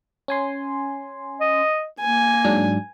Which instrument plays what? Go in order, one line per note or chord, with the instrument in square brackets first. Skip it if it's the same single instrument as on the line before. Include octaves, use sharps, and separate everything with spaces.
[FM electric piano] C#4 G#5 C6
[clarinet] D#5
[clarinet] A#3 [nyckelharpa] G#5
[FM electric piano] G#2 F#3 D4